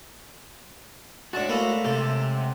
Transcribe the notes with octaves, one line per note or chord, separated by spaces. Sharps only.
A2 G#3 D4 F#4 A5
A3 A#3 E4
C3 G4 A4
F#5